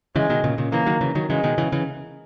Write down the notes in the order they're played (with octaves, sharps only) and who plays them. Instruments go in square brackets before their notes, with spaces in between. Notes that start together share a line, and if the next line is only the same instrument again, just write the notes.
[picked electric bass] C#3 E3 [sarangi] G#3
[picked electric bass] B2 D#3
A#2 C#3
A#2 C#3
[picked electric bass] C#3 E3 [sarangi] A#3
[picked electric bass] D#3 F#3
C#3 E3
D#3 F#3
[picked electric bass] C#3 E3 [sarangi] G#3
[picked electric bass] B2 D#3
C#3 E3
C#3 E3